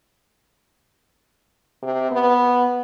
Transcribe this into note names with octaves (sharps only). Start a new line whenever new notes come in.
C3
B3